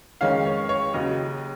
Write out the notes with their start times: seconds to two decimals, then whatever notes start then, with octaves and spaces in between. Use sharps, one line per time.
0.21 F2 D#3 G#3 C#4 F5
0.45 C#5
0.69 C#5
0.94 D#2 C#3 F#3 D#5